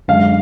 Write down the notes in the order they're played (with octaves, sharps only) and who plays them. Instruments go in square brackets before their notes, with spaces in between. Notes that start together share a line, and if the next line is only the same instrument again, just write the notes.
[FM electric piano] F#2 D3 G#3 D4 [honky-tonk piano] F5